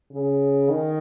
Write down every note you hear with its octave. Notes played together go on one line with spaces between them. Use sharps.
C#3
D#3